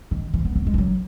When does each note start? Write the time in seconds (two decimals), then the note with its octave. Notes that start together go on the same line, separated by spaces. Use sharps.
0.11 D#3
0.34 E3
0.45 B3
0.56 B3
0.67 G#3
0.74 E3
0.78 F#3